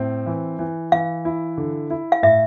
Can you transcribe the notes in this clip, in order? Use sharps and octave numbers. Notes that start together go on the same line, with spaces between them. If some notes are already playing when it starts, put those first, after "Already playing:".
Already playing: A2 C4
E3
E3
E3 F5
E4
D3
E4
F5
A2 E5